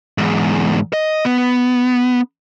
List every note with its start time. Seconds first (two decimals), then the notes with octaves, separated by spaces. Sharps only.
0.18 E2 G#2
0.93 D#5
1.25 B3